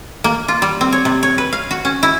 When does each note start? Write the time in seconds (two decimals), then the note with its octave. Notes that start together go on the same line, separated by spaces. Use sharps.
0.24 A#3
0.48 F4
0.62 G3
0.81 C4
0.92 C#5
1.05 C3
1.23 C#5
1.38 B4
1.53 F5
1.71 F#4
1.85 C#4
2.03 E4